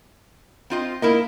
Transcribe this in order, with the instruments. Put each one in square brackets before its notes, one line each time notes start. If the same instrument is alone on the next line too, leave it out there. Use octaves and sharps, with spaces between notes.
[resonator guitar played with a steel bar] C4 F4 D#5
[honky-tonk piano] A#3 [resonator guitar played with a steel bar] E4 A#4 D#5